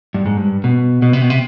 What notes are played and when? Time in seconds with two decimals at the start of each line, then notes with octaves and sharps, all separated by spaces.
0.14 G2
0.26 G#2
0.37 G2
0.64 B2
1.02 B2
1.13 C3
1.21 B2
1.30 C3